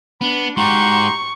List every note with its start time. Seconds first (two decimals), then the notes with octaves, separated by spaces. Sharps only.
0.21 B3 D4 B5
0.57 G#2 F#4 G4 A#5 C6 C#6